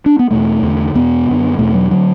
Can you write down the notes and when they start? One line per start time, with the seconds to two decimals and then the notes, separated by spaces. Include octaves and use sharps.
0.06 D4
0.19 B3
0.31 E2 B2 A3
0.62 E2 D3
0.95 E2 B2 B3
1.27 F#2 D3
1.59 E2 B2 A3
1.74 F#3
1.91 D3 F#3